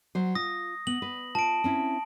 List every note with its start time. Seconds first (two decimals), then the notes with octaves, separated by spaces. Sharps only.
0.15 F#3 C5
0.35 F4 D#6 A#6
0.87 B3 F#7
1.02 B4
1.35 F4 A5 D7
1.64 C4 C#4 E4